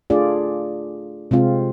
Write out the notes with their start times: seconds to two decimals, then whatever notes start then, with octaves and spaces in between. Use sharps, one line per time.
0.10 A3 D4 F4 G#4 D5
1.31 C3 G#3 C4 F4